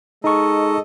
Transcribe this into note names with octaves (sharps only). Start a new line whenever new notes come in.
G#3 D#4 A4 D#5 C#6